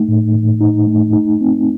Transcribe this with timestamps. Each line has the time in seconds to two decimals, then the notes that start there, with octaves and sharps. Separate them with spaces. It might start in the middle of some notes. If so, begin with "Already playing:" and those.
Already playing: A3 D#4
0.08 A2
0.34 A2
0.61 D#4
0.87 A3
1.13 D#4
1.41 C4